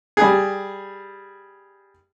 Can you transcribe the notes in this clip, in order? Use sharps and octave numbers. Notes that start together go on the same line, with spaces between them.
G3 G#4